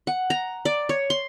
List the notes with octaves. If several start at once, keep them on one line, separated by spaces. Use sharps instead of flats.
F#5
A#5
D5
C#5
C6